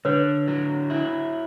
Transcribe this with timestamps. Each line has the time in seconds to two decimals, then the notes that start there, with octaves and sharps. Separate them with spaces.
0.05 D3 B4 C#5
0.48 F#3
0.90 E4